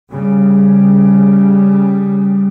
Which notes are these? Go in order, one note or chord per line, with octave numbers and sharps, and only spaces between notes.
C#3 G3